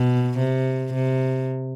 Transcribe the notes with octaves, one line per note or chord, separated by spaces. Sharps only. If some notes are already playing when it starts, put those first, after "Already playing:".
Already playing: B2
C3
C3